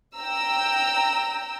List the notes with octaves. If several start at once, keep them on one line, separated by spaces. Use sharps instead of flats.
G5 A#5 E6